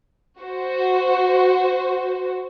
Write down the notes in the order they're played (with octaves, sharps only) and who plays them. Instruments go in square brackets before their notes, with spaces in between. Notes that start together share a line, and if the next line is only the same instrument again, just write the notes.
[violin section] F#4 C5